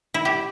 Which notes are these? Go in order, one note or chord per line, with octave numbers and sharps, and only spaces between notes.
E4
G4